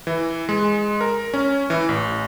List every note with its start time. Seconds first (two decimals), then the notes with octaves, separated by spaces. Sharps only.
0.07 E3
0.49 G#3
1.01 A#4
1.34 C#4
1.70 E3
1.89 A1